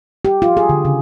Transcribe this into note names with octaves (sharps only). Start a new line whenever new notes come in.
G4
F4
G#4
D3
C#3